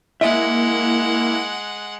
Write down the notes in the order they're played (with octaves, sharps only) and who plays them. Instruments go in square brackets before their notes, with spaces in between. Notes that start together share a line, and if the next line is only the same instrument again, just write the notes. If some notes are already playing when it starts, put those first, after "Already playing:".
[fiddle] G#3 F#5 [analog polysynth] A#3 E4 [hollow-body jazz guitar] E5